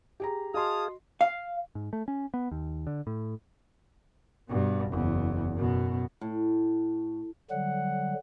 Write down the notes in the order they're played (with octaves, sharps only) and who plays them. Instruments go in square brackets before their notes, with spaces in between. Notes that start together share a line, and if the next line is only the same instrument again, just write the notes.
[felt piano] G4 G#4 A#5
[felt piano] F#4 D#5 C6 [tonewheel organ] G#4 F5 [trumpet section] A5 D#6
[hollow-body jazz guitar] F5
[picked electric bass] G#2
A3
C#4
B3
D#2
D3
A2
[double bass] G2 B2
F#1 E2
F#2 B2
[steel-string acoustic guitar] A2
[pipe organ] D3 F#3 G3 [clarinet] F#5